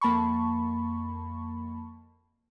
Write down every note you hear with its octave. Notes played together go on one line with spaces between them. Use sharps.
F2 A#3 A5 B5 C#6